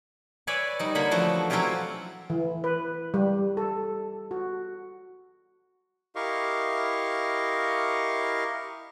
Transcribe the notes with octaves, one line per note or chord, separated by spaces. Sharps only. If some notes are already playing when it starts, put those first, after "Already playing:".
B4 C#5 D5 E5 G#5 B5
G3 D#4
D3 A#3 C#5 B5
E3 F3 A3 F#4
F#3 C4 C#4 E4 F4 G4
E3
B4
G3
A4
F#4
E4 G4 A#4 D#5 F5 C#6